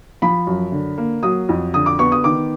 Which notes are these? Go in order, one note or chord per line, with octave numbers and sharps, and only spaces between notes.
F3 B5
F#2
D3
A#3
F#3 D#6
F2
D3 D#6
D6
B3 C#6
D#6
D#3 D6